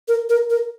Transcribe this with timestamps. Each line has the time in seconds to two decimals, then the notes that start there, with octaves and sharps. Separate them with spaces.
0.08 A#4
0.29 A#4
0.50 A#4